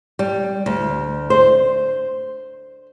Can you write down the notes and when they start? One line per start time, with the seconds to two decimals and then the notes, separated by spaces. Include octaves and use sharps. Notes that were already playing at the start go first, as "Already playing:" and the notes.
0.19 G3
0.66 D2
1.30 C5